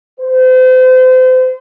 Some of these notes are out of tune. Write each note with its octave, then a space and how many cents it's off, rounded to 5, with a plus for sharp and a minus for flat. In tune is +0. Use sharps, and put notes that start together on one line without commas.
C5 -35